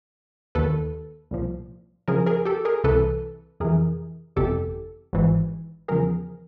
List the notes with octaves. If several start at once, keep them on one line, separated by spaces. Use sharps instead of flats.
D#2 D#3 A4 B4
C2 A#2 F3
F2 C#3 F3 G#4 A#4
G#4 A#4
G4 A4
G#4 A#4
C2 C3 E3 A4 B4
F2 C3 E3 G#4 A#4
G1 F2 C3 E3 G4 A4
G#1 G#2 E3
E2 C#3 F3 G#4 A#4